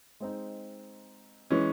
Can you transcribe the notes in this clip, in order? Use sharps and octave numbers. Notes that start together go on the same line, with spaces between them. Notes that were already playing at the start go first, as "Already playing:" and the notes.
G#3 C4 D#4
E3 G#3 C#4